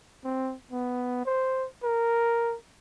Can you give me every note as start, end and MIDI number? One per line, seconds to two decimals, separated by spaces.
0.24 0.54 60
0.72 1.21 59
1.26 1.67 72
1.84 2.55 70